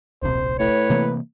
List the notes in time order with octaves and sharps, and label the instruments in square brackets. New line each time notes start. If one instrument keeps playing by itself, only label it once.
[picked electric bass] D1 A#1 C3 [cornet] C5
[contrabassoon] A2 [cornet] B4 [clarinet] C#5
[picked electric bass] C3 E3 A#3